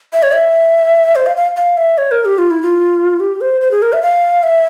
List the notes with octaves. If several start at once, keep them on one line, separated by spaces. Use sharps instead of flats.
E5
C#5
E5
C5
F5
F5
F5
E5
C#5
A#4
G4
F4
E4
F4
G4
C5
C5
G#4
A#4
E5
F5
E5